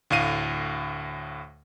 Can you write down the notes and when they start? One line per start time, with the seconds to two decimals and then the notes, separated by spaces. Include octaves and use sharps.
0.10 D2 A2 F5 D#7